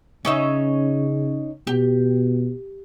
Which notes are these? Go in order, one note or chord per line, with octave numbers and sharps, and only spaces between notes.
C#3 C#4 D#4 E5
B2 G4